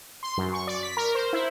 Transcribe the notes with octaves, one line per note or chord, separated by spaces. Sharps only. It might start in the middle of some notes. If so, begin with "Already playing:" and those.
C6
F#2
C#6
D5
B6
A#4
C5
E4